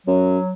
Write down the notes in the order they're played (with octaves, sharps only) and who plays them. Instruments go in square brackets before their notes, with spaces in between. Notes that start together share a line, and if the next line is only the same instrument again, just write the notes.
[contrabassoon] F#2 [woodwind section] F#3